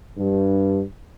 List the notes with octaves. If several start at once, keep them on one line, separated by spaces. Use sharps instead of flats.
G2